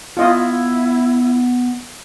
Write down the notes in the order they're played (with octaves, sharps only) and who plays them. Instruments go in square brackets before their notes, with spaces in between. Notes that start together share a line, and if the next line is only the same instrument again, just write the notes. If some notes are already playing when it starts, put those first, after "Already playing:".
[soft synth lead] B3 [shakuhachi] E4 [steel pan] F4 D#5